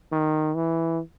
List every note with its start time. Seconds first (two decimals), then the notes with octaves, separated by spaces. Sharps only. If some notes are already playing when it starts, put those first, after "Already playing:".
0.12 D#3
0.55 E3